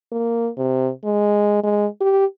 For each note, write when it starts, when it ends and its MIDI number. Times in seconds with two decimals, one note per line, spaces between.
0.12 0.50 58
0.58 0.90 48
1.05 1.63 56
1.63 1.87 56
2.01 2.26 67